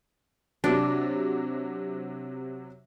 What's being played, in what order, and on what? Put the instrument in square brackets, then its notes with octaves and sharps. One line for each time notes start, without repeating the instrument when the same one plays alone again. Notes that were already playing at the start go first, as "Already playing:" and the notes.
[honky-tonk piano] C3 F#3 [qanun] D4